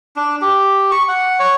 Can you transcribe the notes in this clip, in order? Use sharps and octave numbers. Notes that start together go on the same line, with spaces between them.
D4
G4
C#6
F#5
C#5